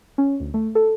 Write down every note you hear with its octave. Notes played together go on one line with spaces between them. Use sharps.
C#4
D2
A3
A4